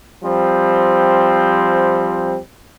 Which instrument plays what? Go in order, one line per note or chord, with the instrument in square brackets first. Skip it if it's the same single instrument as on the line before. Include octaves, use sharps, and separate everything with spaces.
[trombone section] F3 G3 C4